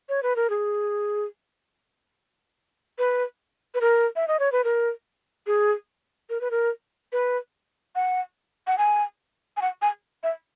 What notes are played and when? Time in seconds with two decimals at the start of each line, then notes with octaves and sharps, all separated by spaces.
0.09 C#5
0.23 B4
0.36 A#4
0.50 G#4
2.98 B4
3.75 B4
3.81 A#4
4.16 E5
4.28 D#5
4.40 C#5
4.52 B4
4.64 A#4
5.47 G#4
6.30 A#4
6.41 B4
6.51 A#4
7.12 B4
7.96 F#5
8.67 F#5
8.78 G#5
9.57 G#5
9.62 F#5
9.82 G#5
10.23 E5